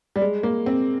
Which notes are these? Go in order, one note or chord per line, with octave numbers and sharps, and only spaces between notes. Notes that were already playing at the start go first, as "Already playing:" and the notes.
G3
G#3
A#3
C4